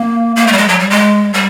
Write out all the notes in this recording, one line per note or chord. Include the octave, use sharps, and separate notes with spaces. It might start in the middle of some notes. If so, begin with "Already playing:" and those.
Already playing: A#3
A#3
A3
G3
G#3
F#3
G3
G#3
G3